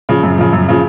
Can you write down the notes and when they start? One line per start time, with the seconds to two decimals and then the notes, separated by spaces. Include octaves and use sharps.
0.09 C#3 F3
0.23 F#2
0.38 C#3 F3
0.53 F#2
0.69 C#3 F3